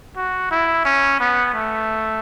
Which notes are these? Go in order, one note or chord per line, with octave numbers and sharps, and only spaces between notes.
F#4
E4
C#4
B3
A3